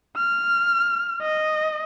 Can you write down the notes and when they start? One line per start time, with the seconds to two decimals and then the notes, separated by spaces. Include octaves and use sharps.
0.17 F6
1.22 D#5